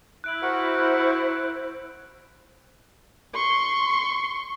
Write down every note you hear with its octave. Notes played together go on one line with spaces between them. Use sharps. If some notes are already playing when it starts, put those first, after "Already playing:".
E4 F#6 D7 F#7
F#4 A#4 C5 F#5
C6 C#6